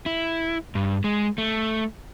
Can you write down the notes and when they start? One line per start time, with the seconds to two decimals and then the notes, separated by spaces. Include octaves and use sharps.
0.06 E4
0.75 G2
1.04 G#3
1.38 A3